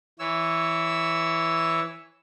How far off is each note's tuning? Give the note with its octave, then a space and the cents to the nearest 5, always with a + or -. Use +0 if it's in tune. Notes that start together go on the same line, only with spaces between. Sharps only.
E3 +0 C#5 +0 E6 +0